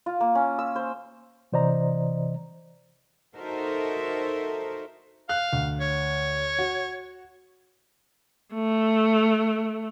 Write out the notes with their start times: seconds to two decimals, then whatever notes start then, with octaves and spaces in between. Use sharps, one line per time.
0.06 F4
0.20 A#3
0.35 C#4
0.59 E6
0.76 C5
1.52 C3 E3 C5 D5 D#5 A#5
3.35 D#4 F#4 A4 A#4 C5 E5
5.29 F5 F#6
5.53 D2
5.81 C#5
6.59 F#4
8.53 A3